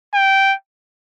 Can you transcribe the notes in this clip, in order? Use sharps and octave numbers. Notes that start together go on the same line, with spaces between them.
G5